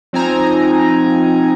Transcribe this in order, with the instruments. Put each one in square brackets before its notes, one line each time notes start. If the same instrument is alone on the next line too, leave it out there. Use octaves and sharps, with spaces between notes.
[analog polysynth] F3 C4 D#4 G#5 A#5